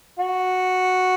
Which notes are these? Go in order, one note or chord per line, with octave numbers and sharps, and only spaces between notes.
F#4